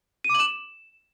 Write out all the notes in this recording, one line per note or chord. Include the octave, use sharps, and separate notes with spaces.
D#7
D6
F#7
E7